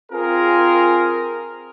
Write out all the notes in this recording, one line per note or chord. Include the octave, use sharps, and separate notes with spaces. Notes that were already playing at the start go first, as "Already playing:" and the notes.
C4 F4 G#4 A#4